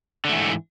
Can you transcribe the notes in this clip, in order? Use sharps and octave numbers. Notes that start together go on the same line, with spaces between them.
G#2 D3 E3 A3